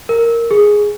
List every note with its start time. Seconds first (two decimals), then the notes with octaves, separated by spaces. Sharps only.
0.09 A#4
0.51 G#4